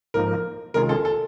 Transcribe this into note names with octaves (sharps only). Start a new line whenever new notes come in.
G#2 F3 A#3 D#4 A#4
C3 D#3 G#3 C#4 F4 A#4
A4
A4